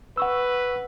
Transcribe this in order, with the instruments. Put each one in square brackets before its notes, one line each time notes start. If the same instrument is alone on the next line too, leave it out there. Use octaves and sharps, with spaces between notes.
[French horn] B4 [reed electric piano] F#5 C#6 E6